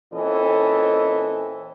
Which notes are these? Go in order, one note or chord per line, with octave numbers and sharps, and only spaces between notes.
A#2 E3 C4 C#4 A4 D#5